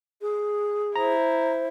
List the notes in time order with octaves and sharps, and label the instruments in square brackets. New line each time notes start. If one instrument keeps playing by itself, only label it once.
[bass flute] G#4
[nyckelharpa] E4 [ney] C5 [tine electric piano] A#5